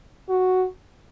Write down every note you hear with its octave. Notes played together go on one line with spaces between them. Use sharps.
F#4